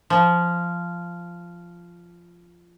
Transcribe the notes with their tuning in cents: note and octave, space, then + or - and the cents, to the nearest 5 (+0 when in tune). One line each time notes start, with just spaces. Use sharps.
F3 -10